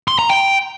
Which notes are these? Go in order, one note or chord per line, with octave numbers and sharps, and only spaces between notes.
C6
A#5
G5